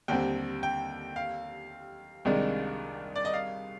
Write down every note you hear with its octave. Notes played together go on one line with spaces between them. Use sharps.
D#2 D3 G3 C4 G5
G5
F5
C2 C3 D#3 G#3 D4
D5
D#5
F5